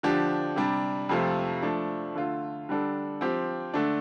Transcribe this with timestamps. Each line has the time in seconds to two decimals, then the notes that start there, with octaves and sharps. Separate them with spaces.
0.03 D3 F3 D4 G4
0.56 C3 G3 D4
1.09 F2 C3 F3 A3 F4
1.62 F3 A3 D4
2.15 D3 A3 F4
2.69 D3 G3 D4 A4
3.21 F3 C4 G4
3.74 D3 A3 D4